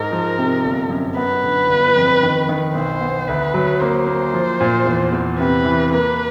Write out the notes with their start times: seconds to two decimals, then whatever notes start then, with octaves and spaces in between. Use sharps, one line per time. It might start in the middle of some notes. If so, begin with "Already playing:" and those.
Already playing: G#2 A#4
0.12 F3
0.38 C3
0.64 G1
0.90 F#2
1.17 B3 B4
1.44 D3
1.69 G1
1.96 F2
2.23 D#3
2.49 D#3
2.75 B1 C5
3.01 B3
3.28 D2 B4
3.54 F#3
3.80 A#3 C5
4.07 A#3
4.34 F3
4.60 A#2
4.86 E2
5.12 E2
5.39 C3 B4
5.65 E3
5.92 A#3 B4